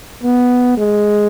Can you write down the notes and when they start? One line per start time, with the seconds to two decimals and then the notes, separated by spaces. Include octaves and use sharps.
0.23 B3
0.77 G#3